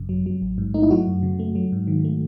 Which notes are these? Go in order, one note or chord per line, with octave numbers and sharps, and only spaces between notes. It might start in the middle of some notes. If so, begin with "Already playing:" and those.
Already playing: G#1 F#2 C#3
F#3
F#3
A1
G#2
A3 D#4
E4
F#3 F#4
F#2
C#3
A3
F#3
G#2
D#3
A3